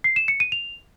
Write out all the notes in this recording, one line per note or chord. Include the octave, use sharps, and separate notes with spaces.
C7
E7
C#7
D#7
F7